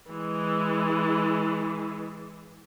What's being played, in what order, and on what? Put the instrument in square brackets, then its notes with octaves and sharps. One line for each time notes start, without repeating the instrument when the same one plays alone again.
[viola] E3 G#3